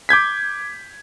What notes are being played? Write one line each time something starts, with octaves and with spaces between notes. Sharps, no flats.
D6 G6 G#6 B6